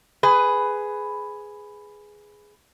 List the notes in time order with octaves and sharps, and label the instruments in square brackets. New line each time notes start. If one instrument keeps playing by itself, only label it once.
[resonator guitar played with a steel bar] G#4 B4